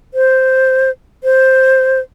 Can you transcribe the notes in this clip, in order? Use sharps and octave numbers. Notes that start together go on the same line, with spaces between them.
C5
C5